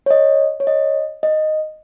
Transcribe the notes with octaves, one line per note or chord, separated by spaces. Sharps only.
C#5
D#5
C#5
D#5
D#5